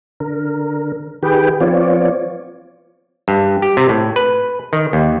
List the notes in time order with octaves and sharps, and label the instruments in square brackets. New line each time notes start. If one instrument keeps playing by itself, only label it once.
[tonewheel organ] D3 A#4
D#3 G4 G#4 B4 G5
F3 B3 C4 F4 C#5 D5
[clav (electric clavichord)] G2
G4
C3
A2
B4
D#3
D#2